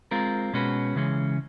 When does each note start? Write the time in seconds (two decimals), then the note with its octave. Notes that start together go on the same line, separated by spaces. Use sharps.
0.11 G#3 C4 F4 A#4
0.53 B2 G#3 C#4 F#4 B4
0.96 C#3 E3 G#3 C#4